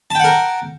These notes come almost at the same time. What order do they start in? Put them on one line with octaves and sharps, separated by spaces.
A5 G5 F#5 A#4